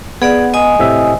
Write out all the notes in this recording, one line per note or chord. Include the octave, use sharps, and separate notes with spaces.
B3 G#4 D5 F#5
D#5 G#5 D#6
A2 C3 E5